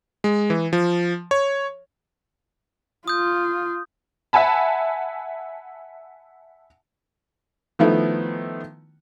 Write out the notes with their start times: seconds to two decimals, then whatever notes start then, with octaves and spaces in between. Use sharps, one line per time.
0.24 G#3
0.50 E3
0.73 F3
1.31 C#5
3.08 F4 D#6 G6
4.33 E5 F#5 G#5 A5 B5
7.79 D#3 F3 A3 B3 E4